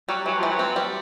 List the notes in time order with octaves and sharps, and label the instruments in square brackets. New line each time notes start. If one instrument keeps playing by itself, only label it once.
[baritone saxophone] F#3 [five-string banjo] G3
[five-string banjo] E3 [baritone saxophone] F#3
[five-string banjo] E3 [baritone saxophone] F3
[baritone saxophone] F#3
[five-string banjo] C4
G3